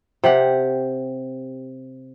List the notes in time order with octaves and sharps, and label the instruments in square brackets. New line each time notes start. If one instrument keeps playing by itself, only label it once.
[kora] C3 G4 F#5